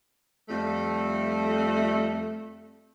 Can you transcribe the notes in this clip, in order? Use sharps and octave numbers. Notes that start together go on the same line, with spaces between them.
F2 G3 A3